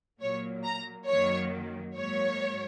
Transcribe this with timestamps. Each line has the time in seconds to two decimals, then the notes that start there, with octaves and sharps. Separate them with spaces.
0.21 A#2 F#3 A#3 C#5
0.64 A#5
1.08 F#2 D#3 F#3 A#3 C#5
1.96 G#2 F#3 A#3 C#5